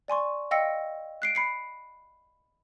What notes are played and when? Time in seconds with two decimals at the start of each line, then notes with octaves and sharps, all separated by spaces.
0.08 D5 G#5 C6 C#6
0.51 D#5 F5 G5 E6 A#6 C#7
1.22 F#6 C7 D7
1.35 B5 C7 C#7